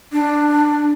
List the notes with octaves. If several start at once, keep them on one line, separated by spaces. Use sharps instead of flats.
D4